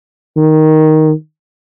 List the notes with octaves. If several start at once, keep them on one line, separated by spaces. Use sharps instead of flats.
D#3